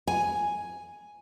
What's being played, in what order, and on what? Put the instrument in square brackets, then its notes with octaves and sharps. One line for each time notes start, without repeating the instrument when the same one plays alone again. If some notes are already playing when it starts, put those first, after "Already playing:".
[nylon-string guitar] G#5